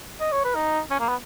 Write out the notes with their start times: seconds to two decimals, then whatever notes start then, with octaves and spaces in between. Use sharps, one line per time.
0.20 D#5
0.32 C#5
0.44 B4
0.55 D#4
0.90 C#4
1.00 A#3
1.09 B3